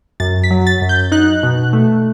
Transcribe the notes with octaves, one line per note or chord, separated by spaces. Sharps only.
F#2 A6
B6
F#3
A6
F#2
G6
D#4 F#6
B2
A3